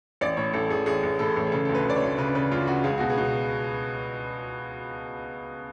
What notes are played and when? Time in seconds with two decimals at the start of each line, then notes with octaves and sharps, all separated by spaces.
0.21 A1 D5
0.37 A2 C#5
0.54 A1 A4
0.70 A1 G#4
0.86 A1 G#4
1.03 A1
1.19 A2 A4
1.36 A1
1.47 G#4
1.52 C#3 A4
1.65 D2 A4
1.75 B4
1.85 C#3 D5
1.96 C#5
2.02 D2
2.18 C#3 B4
2.35 C#3 B4
2.51 D2 F4
2.67 C#3 F#4
2.84 C#2 G#4
2.98 B2 F#4
3.10 G#4
3.17 B2